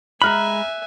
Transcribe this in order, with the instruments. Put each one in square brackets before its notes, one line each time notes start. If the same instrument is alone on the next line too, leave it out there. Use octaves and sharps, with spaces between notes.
[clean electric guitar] G#3 B5 [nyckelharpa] E5 G#5 [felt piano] A#5 F6 F#6